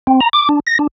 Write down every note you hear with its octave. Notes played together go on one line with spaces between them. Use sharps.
C4
A#5
D6
D4
A#6
D4